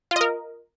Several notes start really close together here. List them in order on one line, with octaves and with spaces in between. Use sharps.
F4 D#5 A#4